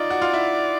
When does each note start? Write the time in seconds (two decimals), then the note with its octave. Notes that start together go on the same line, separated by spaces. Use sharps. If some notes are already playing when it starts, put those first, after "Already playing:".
Already playing: D#4 F4 D5
0.10 F#4
0.22 F4
0.33 E4 F#4